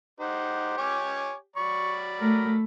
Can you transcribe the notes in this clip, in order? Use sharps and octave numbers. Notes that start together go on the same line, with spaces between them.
D#4 G4 C5 F#5
C#5 G#5 D6
F#3 D5 B5 C#6
A3 A#4